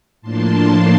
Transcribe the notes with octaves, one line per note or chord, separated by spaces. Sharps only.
A2 F3 A#3 D4 A5 C6